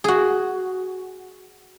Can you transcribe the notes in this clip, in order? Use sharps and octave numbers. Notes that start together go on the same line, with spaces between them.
F#4 G#4